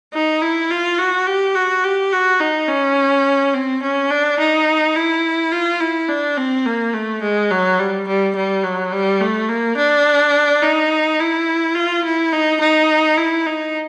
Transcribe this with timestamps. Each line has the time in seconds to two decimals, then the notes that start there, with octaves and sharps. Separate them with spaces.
0.14 D#4
0.42 E4
0.71 F4
0.98 F#4
1.27 G4
1.55 F#4
1.84 G4
2.13 F#4
2.40 D#4
2.69 C#4
3.54 C4
3.82 C#4
4.10 D4
4.39 D#4
4.95 E4
5.52 F4
5.80 E4
6.09 D4
6.37 C4
6.66 A#3
6.94 A3
7.22 G#3
7.51 F#3
7.79 G3
8.08 G3
8.36 G3
8.63 F#3
8.92 G3
9.21 A3
9.49 A#3
9.77 D4
10.62 D#4
11.20 E4
11.75 F4
12.04 E4
12.33 D#4
12.60 D#4
13.17 E4
13.46 D#4